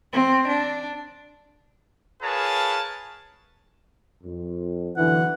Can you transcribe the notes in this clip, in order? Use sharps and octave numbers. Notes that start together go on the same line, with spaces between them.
C4
D4
F4 G#4 A#4 B4 C#5 A5
F2
B1 D3 E3 F#5